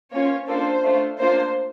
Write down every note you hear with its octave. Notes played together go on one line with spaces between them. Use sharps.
A#3 C#4 F4 C#5
A#3 D4 F4 A4 C5
A3 D4 F4
A#3 D4 F4 C5